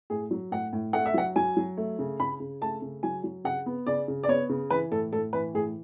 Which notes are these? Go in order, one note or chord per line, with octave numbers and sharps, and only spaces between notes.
A2 G#4
F#3
A2 F#5
A2
A3 F#5
E5
F#3 F#5
F#3 G#5
F#3
A3
C#3
C#3 B5
C#3
A3 A5
C#3
F#3 G#5
F#3
C#3 F#5
B3
C#3 D5
C#3
D5
B3 C#5
C#3
E3 B4
A2 A4
A2 A4
E3 B4
A2 G#4